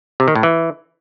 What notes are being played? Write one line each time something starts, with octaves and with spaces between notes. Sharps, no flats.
C3
D#3
A2
E3